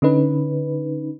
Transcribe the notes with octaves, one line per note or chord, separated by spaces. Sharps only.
D3 C#4 D#4 B4